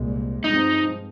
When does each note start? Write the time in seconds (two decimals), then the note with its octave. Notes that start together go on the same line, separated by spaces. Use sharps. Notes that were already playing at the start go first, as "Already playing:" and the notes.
Already playing: C2 A#2 G#3
0.43 G2 F3 G#3 C4 D#4